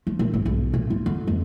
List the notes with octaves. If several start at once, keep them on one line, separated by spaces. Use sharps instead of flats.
F3
A#2
G#1
B1
A#2
F4
D3
F2